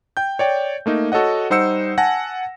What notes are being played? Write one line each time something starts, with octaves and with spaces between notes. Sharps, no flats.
G5 G6
C#5 D5 G5
A3 A#3 D#4
F#4 A4 C#5 D#5 F#5
G3 D#4 C5 F#5 E6 C#7
F#5 G#5 A5 A#6